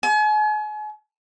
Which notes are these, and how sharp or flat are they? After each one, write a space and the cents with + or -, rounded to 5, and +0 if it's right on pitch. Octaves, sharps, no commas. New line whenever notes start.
G#5 +40